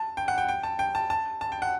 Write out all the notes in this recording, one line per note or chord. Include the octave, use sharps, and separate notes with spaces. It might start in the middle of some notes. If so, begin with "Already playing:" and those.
Already playing: A5
G5
F#5
G5
G5
A5
G5
A5
A5
A5
G5
F#5